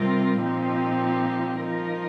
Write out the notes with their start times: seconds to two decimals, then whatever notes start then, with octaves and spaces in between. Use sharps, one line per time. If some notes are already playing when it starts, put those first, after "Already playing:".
Already playing: C3 G3 C4 F4 A#4
0.40 A#2 F3 C4 D#4 G4
1.60 F3 D#4 A#4